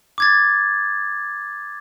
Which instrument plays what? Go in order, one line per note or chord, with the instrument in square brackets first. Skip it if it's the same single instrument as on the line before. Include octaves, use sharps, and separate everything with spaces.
[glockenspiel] D6 G#6 A6